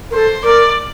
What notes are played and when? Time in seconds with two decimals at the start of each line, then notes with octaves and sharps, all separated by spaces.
0.11 A#4
0.14 A4 C5
0.43 A#4 D5